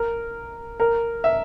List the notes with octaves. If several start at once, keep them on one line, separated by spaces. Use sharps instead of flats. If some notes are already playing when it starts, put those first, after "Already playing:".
Already playing: A#4
A#4
E5